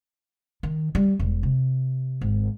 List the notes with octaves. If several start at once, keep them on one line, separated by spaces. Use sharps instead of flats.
D#3
G3
E1
C3
G#1